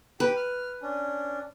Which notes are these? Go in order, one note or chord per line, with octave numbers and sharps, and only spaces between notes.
G4 B4 G5
F6
C#4 D4